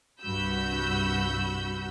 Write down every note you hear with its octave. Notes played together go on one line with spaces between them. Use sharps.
C2 G2 F#4 B5 E6 G6